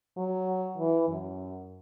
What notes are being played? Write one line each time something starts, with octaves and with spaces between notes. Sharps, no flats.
F#3
E3
F#2